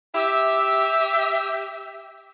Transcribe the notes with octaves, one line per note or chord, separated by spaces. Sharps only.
G4 E5